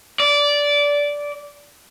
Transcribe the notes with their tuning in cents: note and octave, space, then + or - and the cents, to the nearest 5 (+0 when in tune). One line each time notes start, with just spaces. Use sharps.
D5 -15